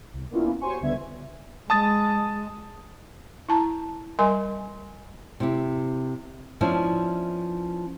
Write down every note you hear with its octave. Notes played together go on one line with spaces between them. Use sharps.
C2
A#3 B3 C#4 D4 E4 F4
F#4 G4 C5 C#5 G#5 C#6
C#2 D3 G3 B3 E5 G#6
G#3 A5 D#6 A6
E4 A5 A#5
G3 A#4 D#5 G#5 C6
C3 E4 G4
F3 B3 C#4 D4 E4